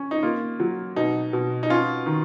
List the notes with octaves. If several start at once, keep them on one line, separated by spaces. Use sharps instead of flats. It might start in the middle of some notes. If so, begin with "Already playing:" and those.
Already playing: C#4
D#4
A#3 F4
F#3
B2 D#4
B2
D#4
C#4 F4
D#3